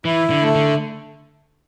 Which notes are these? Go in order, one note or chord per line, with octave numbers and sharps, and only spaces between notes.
E3 E4
D3
A3
D3